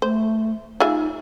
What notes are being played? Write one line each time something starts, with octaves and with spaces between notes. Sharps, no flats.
A3 C5
D#4 F4 G#4 E5